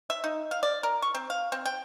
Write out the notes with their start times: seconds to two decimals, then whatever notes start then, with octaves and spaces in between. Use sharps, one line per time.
0.10 E5
0.24 D#4
0.51 F5
0.63 D5
0.83 A#4
1.02 C#6
1.14 C4
1.30 F5
1.52 C4
1.65 G5